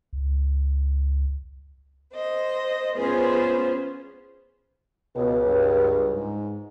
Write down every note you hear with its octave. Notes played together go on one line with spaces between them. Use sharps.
C#2
C5 D#5
B3 C#4 F4 G#4 B4 C5
C#2 B2
G2
G#2